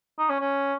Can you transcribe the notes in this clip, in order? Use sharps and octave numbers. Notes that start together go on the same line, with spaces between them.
D#4
C#4
C#4